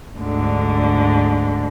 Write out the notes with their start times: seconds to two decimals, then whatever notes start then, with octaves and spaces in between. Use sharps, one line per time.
0.17 D2 G#2 D3